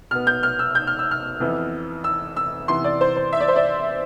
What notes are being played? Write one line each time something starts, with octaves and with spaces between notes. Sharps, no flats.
B2 B3 F6
G6
F6
E6
G6
F6
E6
F6
F2 E3 B3
E6
E6
C3 E3 B3 C6
D5
C5
C5
E5
D5
C5
D5